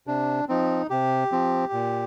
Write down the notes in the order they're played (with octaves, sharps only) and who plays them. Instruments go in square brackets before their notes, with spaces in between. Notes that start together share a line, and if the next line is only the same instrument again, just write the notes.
[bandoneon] C3 D4
F3 C4 D#4
C3 G4
F3 C4
A#2